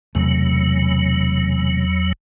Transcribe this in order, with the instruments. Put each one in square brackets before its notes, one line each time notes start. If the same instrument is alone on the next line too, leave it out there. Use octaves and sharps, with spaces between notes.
[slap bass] E1 C3 A3 [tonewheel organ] E2 F#3